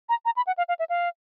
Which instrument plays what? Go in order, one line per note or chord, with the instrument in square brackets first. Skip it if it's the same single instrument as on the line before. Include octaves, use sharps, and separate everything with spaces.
[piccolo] A#5
A#5
B5
F#5
F5
F5
E5
F5